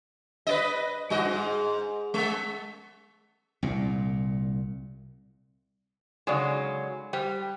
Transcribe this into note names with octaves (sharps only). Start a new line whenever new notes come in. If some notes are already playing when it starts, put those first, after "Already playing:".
B4 D5 D#5
G2 F#4 D#5
G#2
G#3
C2 A#2
C#3 F#3 G#3 D#4 A4 D5
G3 C5